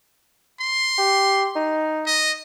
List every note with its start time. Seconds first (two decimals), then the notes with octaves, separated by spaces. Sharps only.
0.61 C6
0.98 G4
1.56 D#4
2.07 D#5